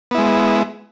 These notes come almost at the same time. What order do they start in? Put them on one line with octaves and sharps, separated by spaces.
B3 E4 G#3